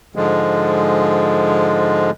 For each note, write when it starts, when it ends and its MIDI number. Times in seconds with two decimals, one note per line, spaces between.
0.16 2.11 44
0.16 2.11 50
0.16 2.11 53
0.16 2.11 56